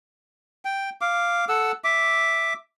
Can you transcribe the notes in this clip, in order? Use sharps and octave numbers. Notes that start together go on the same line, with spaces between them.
G5
F5 D6
A4 F#5 E6
E5 D6